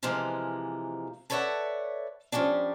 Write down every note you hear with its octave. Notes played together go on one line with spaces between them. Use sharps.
C3 E3 F3 G#3 A#3
A4 B4 C#5 D5 E5 F#5
F3 G3 A#3 C#4 D4